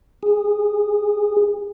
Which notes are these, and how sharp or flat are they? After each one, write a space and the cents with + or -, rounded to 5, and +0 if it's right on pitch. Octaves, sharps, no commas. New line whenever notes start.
G#4 -20